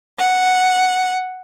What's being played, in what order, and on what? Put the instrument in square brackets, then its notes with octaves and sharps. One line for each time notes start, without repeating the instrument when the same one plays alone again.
[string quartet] F#5